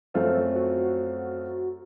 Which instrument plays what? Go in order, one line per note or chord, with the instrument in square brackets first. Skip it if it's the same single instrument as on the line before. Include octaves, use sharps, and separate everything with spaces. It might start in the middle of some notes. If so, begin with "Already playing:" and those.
[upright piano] F#2 F3 A3 C4 F4 [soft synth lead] A4
[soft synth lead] F#4